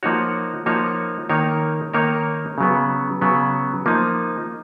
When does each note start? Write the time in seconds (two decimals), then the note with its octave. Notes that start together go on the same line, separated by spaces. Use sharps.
0.03 F3 A#3 D#4 F#4 C#5
0.66 F3 A#3 D#4 F#4 C#5
1.29 D#3 A#3 D#4 A#4 C#5
1.93 D#3 A#3 D#4 A#4 C#5
2.58 C#3 F#3 B3
3.21 C#3 F#3 B3
3.86 F3 A#3 D#4